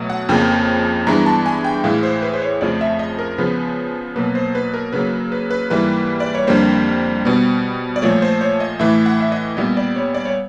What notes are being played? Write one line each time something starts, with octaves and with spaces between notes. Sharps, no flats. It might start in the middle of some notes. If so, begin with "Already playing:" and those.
Already playing: B2 F#3 A3
F#5
F2 C#3 F3 A#3 G5
G2 E3 G#3 B3 A#5
A5
G#5
G5
A2 E3 G#3 F5
C5
B4
C5
C#5
F2 C#3 F3 A3 D5
E5
D#5
A#4
C#3 F3 G#3 B3 B4
B2 F#3 A#3 B4
C5
B4
A#4
C#3 F#3 A#3 B4
B4
B4
G#2 E3 G3 A#3 B4
D5
C#5
F2 D3 G3 A#3 C5
B2 G3 B3
D5
A#2 F3 A3 C#5
C5
C#5
D#5
A2 E3 A3 E5
F#5
E5
D#5
A#2 G3 B3 D#5
D5
C#5
D5
C#5